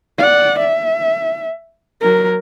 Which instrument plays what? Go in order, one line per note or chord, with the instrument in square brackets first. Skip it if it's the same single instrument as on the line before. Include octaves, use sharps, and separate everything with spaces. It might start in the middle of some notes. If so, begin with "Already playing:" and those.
[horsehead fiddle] D5 F#5
E5
F#3 A#4